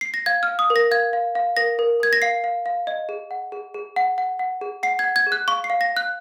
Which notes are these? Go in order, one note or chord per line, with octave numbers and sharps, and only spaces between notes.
C7
A#6
F5 G#6
F6
F5
D#6
A#4
A#6
F5 G#6
F5
F5
A#4 A#6
A#4
A#4 G#6
A#6
F5 C7
F5
F5
D#5
G#4
F#5
G#4
G#4
F#5
F#5
F#5
G#4
F#5 C7
G#6
F#5
G#6
G#4
F#6
F5 C#6
C7
F5
A#6
F5
F#6